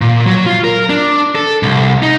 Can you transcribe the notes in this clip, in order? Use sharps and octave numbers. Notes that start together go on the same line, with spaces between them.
A#2
F#3
F4
A#4
D4
A4
C2
D#4